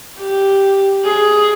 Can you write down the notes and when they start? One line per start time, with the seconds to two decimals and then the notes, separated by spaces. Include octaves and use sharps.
0.20 G4
1.05 G#4